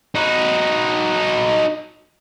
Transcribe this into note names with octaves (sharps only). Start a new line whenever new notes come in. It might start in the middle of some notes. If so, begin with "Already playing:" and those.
D#4 F#4